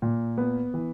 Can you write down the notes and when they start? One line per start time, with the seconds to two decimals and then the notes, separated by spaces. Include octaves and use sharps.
0.02 A#2
0.38 B3
0.74 E3